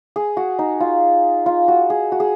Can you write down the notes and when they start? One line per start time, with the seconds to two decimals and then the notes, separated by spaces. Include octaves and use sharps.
0.16 G#4
0.37 F#4
0.59 D#4
0.80 F4
1.46 F4
1.68 F#4
1.90 G#4
2.12 F#4
2.20 G#4